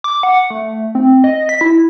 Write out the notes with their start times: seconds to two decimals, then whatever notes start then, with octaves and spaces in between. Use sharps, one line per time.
0.04 D6
0.23 F#5
0.50 A3
0.95 C4
1.24 D#5
1.49 B6
1.61 E4